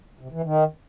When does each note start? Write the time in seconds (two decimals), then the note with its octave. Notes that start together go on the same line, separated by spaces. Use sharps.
0.21 C3
0.32 E3
0.43 D#3